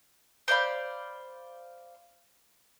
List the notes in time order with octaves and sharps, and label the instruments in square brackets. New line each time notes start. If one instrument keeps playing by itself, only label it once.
[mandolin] C5 D5 F5 B5